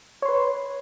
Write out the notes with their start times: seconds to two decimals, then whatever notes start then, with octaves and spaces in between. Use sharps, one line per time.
0.22 C#5
0.25 C6
0.28 B4